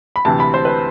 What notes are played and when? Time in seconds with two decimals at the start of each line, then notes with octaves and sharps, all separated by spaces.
0.16 B5
0.25 D2 C3 E3 A5
0.40 B5
0.54 C5
0.65 B4